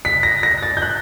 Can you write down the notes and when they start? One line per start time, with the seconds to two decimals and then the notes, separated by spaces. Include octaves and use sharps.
0.05 B6
0.23 A#6
0.43 A#6
0.63 A6
0.77 G6
0.82 F#6